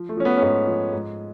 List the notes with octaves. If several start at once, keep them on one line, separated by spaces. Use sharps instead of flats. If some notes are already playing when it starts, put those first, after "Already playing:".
Already playing: F3
A3
F3 C#4
B3
C#4
G#2 B3
F3
G#2